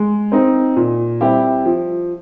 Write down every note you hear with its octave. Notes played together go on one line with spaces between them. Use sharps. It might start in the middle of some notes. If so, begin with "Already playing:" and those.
Already playing: G#3
C4 D#4
A#2
G3 C4 E4 G4
F3